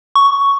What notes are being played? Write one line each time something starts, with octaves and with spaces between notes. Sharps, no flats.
C#6